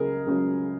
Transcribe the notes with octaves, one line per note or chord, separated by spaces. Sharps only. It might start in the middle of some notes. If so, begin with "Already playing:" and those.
Already playing: C#2 C#3 F#3 G#4 A#4
C#2 C#3 F#3